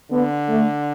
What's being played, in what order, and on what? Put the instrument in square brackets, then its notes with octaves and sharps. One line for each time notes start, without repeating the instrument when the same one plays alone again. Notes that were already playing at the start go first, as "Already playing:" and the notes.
[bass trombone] D3 [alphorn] B3
[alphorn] A3